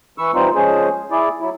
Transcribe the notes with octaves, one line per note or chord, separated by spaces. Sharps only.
E3 B4 C#6 E6
E3 G3 C4 D#4 F4 C5
F3 G#3 C#4 G#4 C5
E4 G#4 D5
F#3 E4